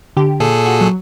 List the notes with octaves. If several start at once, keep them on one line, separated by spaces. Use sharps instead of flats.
D3 G4
A#2 G#4 A4
F#4
F#3